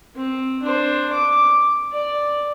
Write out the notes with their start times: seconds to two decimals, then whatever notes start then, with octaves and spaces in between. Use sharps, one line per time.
0.16 C4
0.62 D4 C5
1.13 D6
1.92 D5